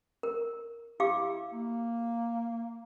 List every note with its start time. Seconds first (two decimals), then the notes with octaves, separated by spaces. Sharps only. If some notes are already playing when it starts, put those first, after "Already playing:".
0.23 A#4
1.00 E4 G4 F5 D6
1.52 A#3